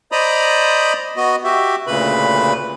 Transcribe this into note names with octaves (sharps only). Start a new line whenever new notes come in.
C5 D5 D#5 A#5 B5 D#6
B3 F#4 D#5
F#4 G4 E5
D2 A#2 C#3 B4 B5